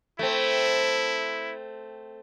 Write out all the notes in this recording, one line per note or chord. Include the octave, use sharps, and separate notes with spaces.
A3 C4 E4